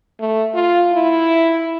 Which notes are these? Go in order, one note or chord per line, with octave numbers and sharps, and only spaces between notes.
A3
F4
E4